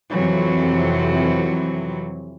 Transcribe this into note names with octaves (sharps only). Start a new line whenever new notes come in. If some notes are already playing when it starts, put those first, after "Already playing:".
F2 C3 E3 F#3